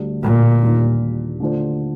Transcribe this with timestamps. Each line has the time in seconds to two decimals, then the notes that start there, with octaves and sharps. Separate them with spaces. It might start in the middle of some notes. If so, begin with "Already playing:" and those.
Already playing: D2 D3 G3 D4
0.23 A#2
0.62 D#2 D#3 G3 D4 F4
1.40 D3 A3 D4 F4 C5